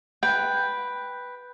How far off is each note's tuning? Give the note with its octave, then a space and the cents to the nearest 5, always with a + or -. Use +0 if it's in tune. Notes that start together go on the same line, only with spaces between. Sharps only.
B4 +0 G5 +5